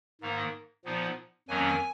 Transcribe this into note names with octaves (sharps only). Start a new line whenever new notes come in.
G#2 D#3 A#3 D#4
A#2 F3 B3 D#4
F2 D#3 F#3 A#3 C#4 G#5